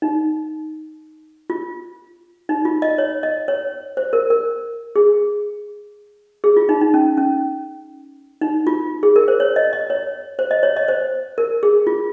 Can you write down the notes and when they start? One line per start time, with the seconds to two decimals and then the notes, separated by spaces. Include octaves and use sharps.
0.02 D#4
1.50 F4
2.49 D#4
2.65 F4
2.82 D#5
2.98 C#5
3.23 D#5
3.48 C#5
3.97 C5
4.13 A#4
4.30 A#4
4.96 G#4
6.44 G#4
6.57 F4
6.69 D#4
6.81 D#4
6.94 C#4
7.17 C#4
8.41 D#4
8.67 F4
9.03 G#4
9.16 A#4
9.28 C5
9.40 C#5
9.56 D#5
9.73 D#5
9.90 C#5
10.39 C5
10.51 D#5
10.63 C#5
10.76 D#5
10.88 C5
11.38 A#4
11.63 G#4
11.87 F4